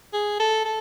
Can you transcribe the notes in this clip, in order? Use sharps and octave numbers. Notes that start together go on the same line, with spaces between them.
G#4
A4
A4